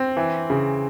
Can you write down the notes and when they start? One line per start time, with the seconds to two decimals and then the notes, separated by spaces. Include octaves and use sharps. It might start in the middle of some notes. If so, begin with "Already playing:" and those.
Already playing: C4
0.17 E3
0.50 C#3